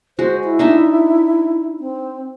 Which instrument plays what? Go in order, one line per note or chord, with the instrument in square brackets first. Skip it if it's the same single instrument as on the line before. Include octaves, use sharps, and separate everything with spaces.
[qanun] G#3 F#4 [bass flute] C5
[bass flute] E4
[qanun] D4 D#4 E5
[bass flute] C4